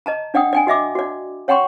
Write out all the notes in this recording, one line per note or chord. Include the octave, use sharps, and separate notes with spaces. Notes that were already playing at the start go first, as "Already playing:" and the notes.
D#5 A5 A#5
D4 D5 F#5 G5 D#6
D5 G5 G#5
F#4 D#5 E5 D6
F#4 D5
C#5 F#5 G5 A#5 C6 C#6